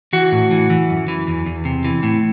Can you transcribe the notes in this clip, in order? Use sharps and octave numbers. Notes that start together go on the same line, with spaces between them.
E3 F#4
A2
E3
E3
F#2
E3
E2
E2
C3
E3
A2